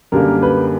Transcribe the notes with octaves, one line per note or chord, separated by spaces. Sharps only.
F#2 D3 G3 A#3 A#4
B4